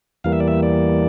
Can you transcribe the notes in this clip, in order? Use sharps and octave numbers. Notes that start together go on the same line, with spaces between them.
E2 E3 G3 A#3 F5
E5
D5
E5
D5